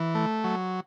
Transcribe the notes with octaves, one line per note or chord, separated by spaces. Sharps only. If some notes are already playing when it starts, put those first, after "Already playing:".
Already playing: E3
A3
F#3